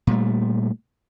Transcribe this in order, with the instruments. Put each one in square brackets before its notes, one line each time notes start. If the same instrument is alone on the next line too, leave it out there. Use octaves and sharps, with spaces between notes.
[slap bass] A#2 G3 A3